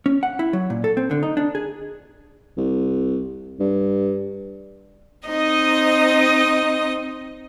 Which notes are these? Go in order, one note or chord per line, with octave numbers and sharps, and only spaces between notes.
C#4
F#5
E4
F#3
A#2
A4
C4
D3
D#4
D4
G#4
C2
G2
C4 D#4 D#5 D#6